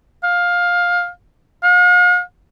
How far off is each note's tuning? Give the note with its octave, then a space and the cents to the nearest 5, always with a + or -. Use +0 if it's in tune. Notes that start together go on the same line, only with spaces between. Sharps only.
F5 +15
F5 +45